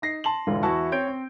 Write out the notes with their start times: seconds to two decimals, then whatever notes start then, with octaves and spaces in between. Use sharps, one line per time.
0.02 D#4 A#6 C7
0.24 A5 C6 F#7
0.47 E1 G#2 D3 E3 F4
0.63 E2 E4 F#4 A5 C#6
0.92 C4 C#5 G6 D7
1.08 C4